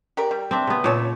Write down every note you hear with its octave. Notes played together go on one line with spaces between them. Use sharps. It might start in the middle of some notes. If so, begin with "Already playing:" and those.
G4 A#4 D5
G3
C4 D4 E5
C#3 B3
A#2 B4 C#5 A5